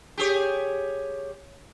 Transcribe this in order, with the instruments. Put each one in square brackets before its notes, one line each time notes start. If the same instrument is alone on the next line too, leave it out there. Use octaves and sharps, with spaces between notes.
[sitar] G4 G#4 C#5